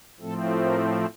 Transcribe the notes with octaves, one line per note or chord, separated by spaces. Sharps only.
A2 F3 A3 C4 A4
A#4